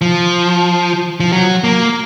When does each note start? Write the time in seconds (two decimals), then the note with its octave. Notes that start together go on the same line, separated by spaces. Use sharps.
0.01 F3
1.20 F3
1.32 F#3
1.64 A#3